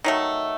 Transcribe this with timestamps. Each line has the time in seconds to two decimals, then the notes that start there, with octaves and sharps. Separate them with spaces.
0.04 D#3 F#3 A3